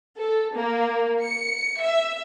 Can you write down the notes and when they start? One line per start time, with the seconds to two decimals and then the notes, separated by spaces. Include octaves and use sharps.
0.17 A4
0.55 A#3
1.22 C#7
1.81 E5